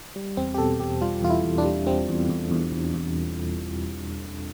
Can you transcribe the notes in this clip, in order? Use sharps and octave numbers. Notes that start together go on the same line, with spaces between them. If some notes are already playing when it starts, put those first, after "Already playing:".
G3
E2 C4
G4
B2 A4
E2 G4
G3 F4
E2 F4
E4
E2
D4
G3
G3 C4
E2
E2
E2
E2
E2